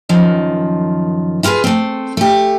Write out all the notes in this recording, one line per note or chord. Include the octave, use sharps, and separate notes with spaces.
F#2 D#3 F3
E4 F4 G4 G#4 B4
A3 C4
A3 G4